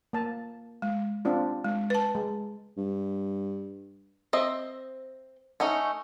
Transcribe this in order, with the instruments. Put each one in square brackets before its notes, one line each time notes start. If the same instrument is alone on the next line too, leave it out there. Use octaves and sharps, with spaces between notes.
[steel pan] A#3 A5
[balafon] G#3
[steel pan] C4 D4 F4
[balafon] G#3
B4 A5
[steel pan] G#3
[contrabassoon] G2
[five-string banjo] C4 D#5 E5
A3 C#4 D#4